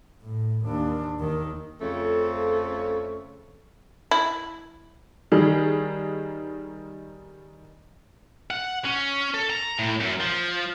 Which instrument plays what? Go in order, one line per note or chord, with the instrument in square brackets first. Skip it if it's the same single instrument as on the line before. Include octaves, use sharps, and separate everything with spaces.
[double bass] A2
D#2 D4
D#2 D#3
[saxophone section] F2 C#3 F3 A3 A4 C#5
[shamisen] E4
[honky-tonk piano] D#3 G3 G#4
[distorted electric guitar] F#5
C#4
A4
A#5
A2
F#2
F3